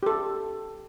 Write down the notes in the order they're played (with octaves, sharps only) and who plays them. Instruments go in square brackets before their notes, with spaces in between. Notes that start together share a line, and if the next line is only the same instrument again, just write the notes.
[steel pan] G4 A4